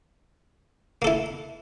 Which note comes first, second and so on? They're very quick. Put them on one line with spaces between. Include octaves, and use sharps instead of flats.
A#3 A4 E4